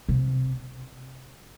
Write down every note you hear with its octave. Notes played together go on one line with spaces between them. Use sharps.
C3